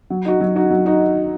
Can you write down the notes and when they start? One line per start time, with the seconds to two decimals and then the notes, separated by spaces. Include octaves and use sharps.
0.10 F#3
0.25 D#4 F#4
0.40 F#3
0.55 D#4 F#4
0.70 F#3
0.86 D#4 F#4